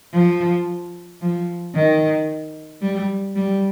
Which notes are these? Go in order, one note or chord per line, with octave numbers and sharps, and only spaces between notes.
F3
F3
D#3
G3
G3